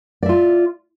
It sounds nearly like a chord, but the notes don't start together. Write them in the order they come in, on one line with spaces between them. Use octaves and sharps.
D5 E5 F4